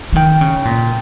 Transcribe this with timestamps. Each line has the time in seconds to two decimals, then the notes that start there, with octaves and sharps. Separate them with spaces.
0.13 F3
0.16 D#3 G5
0.41 C#3
0.65 A#2